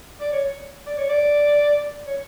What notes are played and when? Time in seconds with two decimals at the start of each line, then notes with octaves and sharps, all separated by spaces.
0.20 D5
0.32 C#5
0.87 D5
0.98 C#5
1.09 D5
2.07 C#5